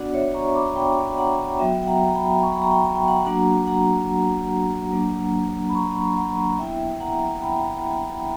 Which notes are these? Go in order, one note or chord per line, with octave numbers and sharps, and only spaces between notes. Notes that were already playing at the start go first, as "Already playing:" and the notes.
Already playing: B3 D4 F#4 D5 F#5
C#5 E5
A#5 C#6
B5 D6
A#5
G5 B5
F#5 A#5
F#3 B3 F#4 E5 G5
G5
F#5 A#5
A#5
G5 B5
C#6
B5
A#5
G5 B5
A#5
G5
F#5 A#5
F#3 A#3 D4 F#4 F#5 A#5
F#5 A#5
F#3 A#3 D4
B5
A#5 C#6
F#5 A#5
B3 E4 E5 G5
F#5 A#5
G5 B5